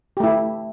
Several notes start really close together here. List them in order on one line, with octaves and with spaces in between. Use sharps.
G4 A3 E4